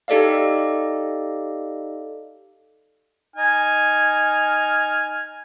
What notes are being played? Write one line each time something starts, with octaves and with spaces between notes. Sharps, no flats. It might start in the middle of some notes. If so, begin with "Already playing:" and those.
D#4 G4 A4 D5 D#5 F5
D#4 G#5 F6